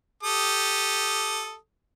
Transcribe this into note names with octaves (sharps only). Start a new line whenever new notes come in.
G4 A4 D#6